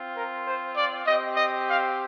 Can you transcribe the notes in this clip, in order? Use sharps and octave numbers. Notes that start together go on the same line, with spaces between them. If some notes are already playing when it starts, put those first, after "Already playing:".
Already playing: C4 F4
A#4
C5
D5
C4 G4 D#5
D#5
F5